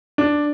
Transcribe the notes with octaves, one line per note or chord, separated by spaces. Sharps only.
D4